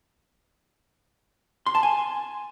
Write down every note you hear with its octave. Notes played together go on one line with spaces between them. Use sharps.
C6
A5
G#5